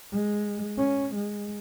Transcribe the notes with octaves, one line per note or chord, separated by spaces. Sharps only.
G#3
C#4
G#3